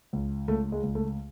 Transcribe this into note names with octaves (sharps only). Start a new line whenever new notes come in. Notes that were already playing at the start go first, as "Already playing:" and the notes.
C#2
C#2 A3
G#3
C#2
A3